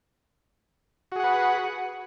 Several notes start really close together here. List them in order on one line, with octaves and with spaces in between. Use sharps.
F#4 G#4 F#5 B4